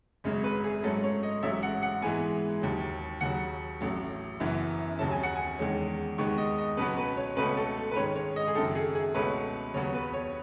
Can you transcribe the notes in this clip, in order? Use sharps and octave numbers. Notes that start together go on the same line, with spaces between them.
G#1 F#2 C#3 G#3
B4
G#4
G#2 F#3 A3 C#4 A4
C#5
D#5
A1 G#2 F#3 C#4 E5
F#5
F#5
G#2 E3 G#3 B3 G#5
D#2 D#3 F#3
D#2 C#3 F#3 F#5
A1 A2 F#3
F#1 F#2 E3 B3
D#2 C#3 F#3 C#4 A5
G#5
F#5
G#5
E2 D#3 G#3 C#4
D#2 D#3 G#3 B3 C#6
D#5
D#5
C#2 B2 F#3 B3 B4
B4
C#5
C#2 B2 A3 C#4 B4
A4
B4
G#2 D#3 G#3 C#4 C#5
C#5
D#5
G#4
F#1 F#2 D#3 A4
G#4
G#4
C#2 B2 A3 C#4 B4
D#2 C#3 F#3 B3 C#5
B4
C#5